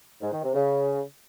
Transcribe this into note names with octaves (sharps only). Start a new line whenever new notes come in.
G#2
D#3
C3
C#3